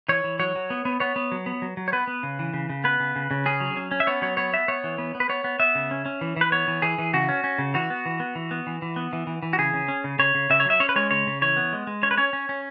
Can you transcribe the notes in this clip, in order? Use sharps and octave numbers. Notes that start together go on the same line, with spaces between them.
E3 C#5
E3
F#3 C#5
F#3
B3
B3
B3 C#5
B3
F#3
B3
F#3
F#3
C#5
B3 B4
B3
C#3
E3
C#3
C#3
B3 B4
C#3
C#3
C#3
C#4 G#4
F#3
C#4
C#4
E5
B3 C#5
F#3 C#5
B3 C#5
B3 E5
B3 C#5
E3
B3
B3
B4
B3 C#5
B3
B3 E5
C#3
C#4
C#4
E3
E3 B4
B3 C#5
E3
E3 G#4
E3
C#3 F#4
C#4
C#4
C#3
E3 F#4
B3
E3
B3
E3
B3
E3
E3
B3
E3
E3
E3
F#4
C#3 G#4
C#3
C#4
C#3
C#3 C#5
C#3
C#3 E5
C#5
F#3 E5
C#4 C#5
B4
G#3 C#5
C#3 C#5
C#3
E3 C#5
B3
G#3
G#3
C#4 C#5
B4
C#4 C#5
C#4
C#4